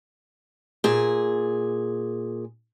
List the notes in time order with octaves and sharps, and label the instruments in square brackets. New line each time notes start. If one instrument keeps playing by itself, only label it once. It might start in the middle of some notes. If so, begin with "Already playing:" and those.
[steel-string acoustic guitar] A#2 G#4